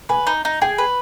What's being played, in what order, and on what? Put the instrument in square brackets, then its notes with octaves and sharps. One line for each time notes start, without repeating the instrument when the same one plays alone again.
[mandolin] B4 [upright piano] G#5
[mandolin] D#4
D#4
[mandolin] G#4 [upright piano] G5
[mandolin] B4